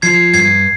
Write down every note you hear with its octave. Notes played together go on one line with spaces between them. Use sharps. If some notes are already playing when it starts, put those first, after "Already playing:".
F3 G#6 C7
G2 G#6 C7